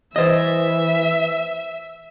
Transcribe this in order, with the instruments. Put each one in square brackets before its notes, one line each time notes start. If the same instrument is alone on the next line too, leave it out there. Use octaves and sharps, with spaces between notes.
[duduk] E3 [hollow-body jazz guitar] C5 D#5 [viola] E5